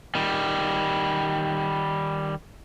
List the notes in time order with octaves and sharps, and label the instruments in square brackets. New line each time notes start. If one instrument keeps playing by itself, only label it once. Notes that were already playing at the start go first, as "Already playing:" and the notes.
[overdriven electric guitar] D#3 G3